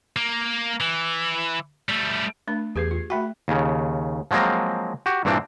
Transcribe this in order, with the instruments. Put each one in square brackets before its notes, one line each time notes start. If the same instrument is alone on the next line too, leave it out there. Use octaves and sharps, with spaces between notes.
[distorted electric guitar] A#3
E3
G3 A3
[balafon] A3 D4 B5
[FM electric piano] E2 G#6 C7 [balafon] G4 G#4 B4
[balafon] F4
[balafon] A3 E5 G5 [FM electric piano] F#4 B5
[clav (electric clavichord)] D#2 C#3
F3 F#3 G#3 A#3 C4
F#4 G4
G2 A#2 E3 C4 D4